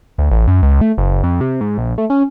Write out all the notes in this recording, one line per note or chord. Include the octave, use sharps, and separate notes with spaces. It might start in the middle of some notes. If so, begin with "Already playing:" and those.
D2
A1
F#2
C#2
A3
F#1
F2
C3
G#2
A#1
A3
C#4